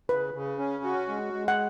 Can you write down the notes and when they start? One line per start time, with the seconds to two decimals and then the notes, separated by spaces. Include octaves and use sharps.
0.09 C#3 B4
0.34 C#3
0.58 C#4
0.84 F#4
1.08 G#3
1.33 G#3
1.48 F#5